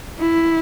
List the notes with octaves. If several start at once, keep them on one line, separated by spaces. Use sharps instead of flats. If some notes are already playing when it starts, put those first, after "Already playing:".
E4